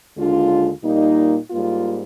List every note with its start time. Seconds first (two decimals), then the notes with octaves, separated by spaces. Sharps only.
0.17 D#2 D3 G#3 D4 F4
0.83 A#2 G3 A#3 D#4
1.50 G#2 G3 A#3 F4